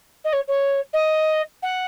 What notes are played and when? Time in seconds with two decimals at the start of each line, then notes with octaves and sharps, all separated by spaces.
0.25 D#5
0.33 C#5
0.48 C#5
0.93 D#5
1.63 F#5